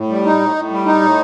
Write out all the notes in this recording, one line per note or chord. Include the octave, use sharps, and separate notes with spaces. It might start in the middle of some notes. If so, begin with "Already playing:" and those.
Already playing: A2
G3
D#4
A2
A2
G3
D#4
A2